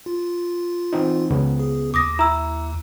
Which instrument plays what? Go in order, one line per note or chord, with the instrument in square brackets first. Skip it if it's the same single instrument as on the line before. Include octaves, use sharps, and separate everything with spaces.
[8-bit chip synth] F4
[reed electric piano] E3 C4 D#4
C#2 C#3 B3
[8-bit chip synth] G#4
[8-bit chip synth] D#2 [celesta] D6 D#6 A#6
[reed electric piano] E4 [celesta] A#5 E6